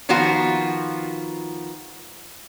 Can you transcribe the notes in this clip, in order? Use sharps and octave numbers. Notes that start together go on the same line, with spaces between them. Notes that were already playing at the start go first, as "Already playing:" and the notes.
D#3 F3 B3 F4 F#4